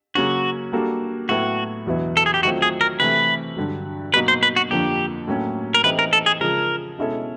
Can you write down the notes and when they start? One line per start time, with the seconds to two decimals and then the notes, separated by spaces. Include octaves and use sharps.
0.15 C#3 F#3 A#3 C#4 F#4
0.72 G3 A#3 D4 F#4 A4
1.29 A2 F#3 B3 E4 F#4 A4
1.86 E2 B2 F#3 B3 E4
2.17 A4
2.26 G#4
2.34 G4
2.43 D#3 F#3 A3 C4 F4 F#4
2.62 G#4
2.81 A#4
3.00 C3 E3 A3 B4
3.56 G2 D3 F#3
4.14 B2 F#3 A#3 D#4 F#4 B4
4.28 C5
4.43 B4
4.56 F#4
4.71 F2 D3 F3 A#3 D4 G4
5.27 A2 F#3 A#3 C#4
5.74 A#4
5.84 E3 A3 C4 D#4 G4 B4
5.99 A#4
6.13 A4
6.26 G#4
6.41 C#3 F3 G#3 A#4
6.99 B2 G#3 C#4 E4 A4